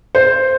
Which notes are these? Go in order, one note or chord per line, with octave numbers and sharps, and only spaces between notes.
C5